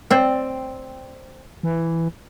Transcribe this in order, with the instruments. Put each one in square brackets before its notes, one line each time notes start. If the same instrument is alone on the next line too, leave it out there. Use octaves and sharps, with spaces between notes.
[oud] C4 D5
[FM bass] E3